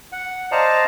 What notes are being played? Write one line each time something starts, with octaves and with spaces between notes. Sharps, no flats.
F#5
C5 D5 D#5 F5 A5 A#5